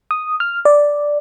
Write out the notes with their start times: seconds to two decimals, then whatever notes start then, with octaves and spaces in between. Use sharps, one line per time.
0.11 D#6
0.40 F6
0.65 D5